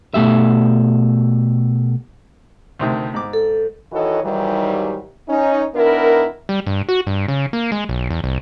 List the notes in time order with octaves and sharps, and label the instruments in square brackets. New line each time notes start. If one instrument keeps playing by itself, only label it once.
[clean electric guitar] B2 A3 G4 E5
[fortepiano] D2 C3 D#3
G#2 D6
[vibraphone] A4
[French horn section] D#3 E3 F#4 A4 C#5 D#5
G#2 D#3 E3 F#3 G3
C#4 D#4
D#3 B3 D4 E4 A#4
[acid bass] G3
G2
F#4
G2
C#3
A#3
G#3
B1
E2
C2